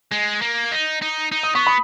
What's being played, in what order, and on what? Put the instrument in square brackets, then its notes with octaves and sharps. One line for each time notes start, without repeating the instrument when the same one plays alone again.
[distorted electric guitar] G#3
A#3
D#4
D#4
D#4
[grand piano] D#6
[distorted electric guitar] B3 [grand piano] C#6
[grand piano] B5 D#6